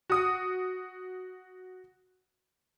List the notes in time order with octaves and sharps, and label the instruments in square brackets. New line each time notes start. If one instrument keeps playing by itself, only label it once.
[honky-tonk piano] F#4 D#6